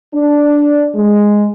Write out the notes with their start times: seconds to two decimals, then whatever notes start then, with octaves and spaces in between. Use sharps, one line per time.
0.14 D4
0.95 G#3